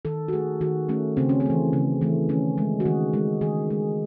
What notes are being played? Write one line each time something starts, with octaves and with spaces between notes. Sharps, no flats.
D#3 A4
F#4
A3 G#4
D#3 F#4
A3 C#4
C#3 C4
C#4
C4
E3 A3
C#3
E3 A3
D#3 C#4
G#3
F#4
D#3 G#4
G#3
D#3 G#4
G#3